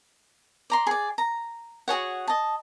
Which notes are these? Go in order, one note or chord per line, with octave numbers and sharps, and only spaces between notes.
D5 A#5 C6
G#4 D5
A#5
F#4 G#4 C#5 F#5
D#5 A5